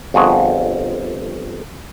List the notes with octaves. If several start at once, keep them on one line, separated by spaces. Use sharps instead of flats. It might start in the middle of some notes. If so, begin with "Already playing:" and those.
G1 F2 F#4 G#4